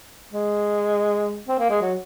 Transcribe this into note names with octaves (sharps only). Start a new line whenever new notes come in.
G#3
C4
A#3
G#3
F#3